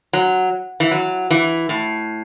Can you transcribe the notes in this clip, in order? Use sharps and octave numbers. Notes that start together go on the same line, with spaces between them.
F#3
E3
F#3
E3
A2